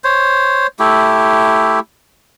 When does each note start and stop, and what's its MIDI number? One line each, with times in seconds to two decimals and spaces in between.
0.04 0.67 72
0.04 0.67 73
0.79 1.80 57
0.79 1.80 64
0.79 1.80 67